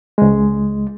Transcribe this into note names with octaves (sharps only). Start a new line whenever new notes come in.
C#2 G#3